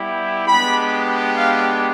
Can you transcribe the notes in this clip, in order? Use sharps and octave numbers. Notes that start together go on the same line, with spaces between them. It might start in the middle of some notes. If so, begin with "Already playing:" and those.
Already playing: G3 B3 E4 G4
G#3 B3 D4 G4 B5
F5